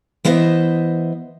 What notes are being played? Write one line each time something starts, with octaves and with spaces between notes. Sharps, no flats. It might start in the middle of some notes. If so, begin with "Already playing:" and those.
E3 B3 C5 D#5 E5